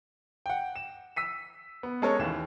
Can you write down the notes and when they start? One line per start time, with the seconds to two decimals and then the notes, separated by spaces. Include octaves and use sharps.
0.46 F#5 G5
0.76 E7
1.16 E6 B6 D#7
1.83 B3
2.02 G#3 C#4 A4 A#4 C#5
2.19 D#2 E3 E7